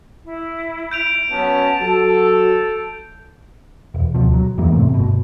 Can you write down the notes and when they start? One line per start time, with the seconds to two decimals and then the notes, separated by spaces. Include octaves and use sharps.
0.25 E4
0.91 G6 D7 F7
1.31 F#3 B3 C#4 A5
1.80 F#3 F#4 A4
3.94 E1
4.15 D2 B2 F3
4.34 F#3
4.58 E2 E3 G#3 A#3
4.73 G#2 C3 A3 C4
4.89 G1 B2